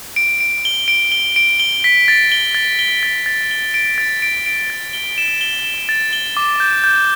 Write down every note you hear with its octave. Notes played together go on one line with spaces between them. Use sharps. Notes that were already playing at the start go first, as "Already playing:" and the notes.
D7
D7
G7
D7
G7
D7
G7
B6
A6
G7
A6
G7
A6
A6
G7
D7
A6
D7
D7
A6
G7
E7
G7
E7
A6
G7
D6
G6
G6